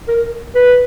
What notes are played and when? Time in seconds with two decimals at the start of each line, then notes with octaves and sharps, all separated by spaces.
0.08 A#4
0.55 B4